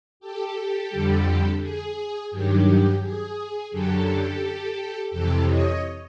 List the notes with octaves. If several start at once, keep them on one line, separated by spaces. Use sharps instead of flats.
G4 A4
F2 D3 G3
G#4
G2 D#3 F#3 G4
G#4
F#2 D3 F#3 G4 A4
F2 C3 E3 G4 A4
C#5 D#5